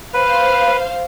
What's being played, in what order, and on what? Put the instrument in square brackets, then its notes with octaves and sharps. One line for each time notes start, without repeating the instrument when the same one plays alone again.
[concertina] B4 [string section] C5 F5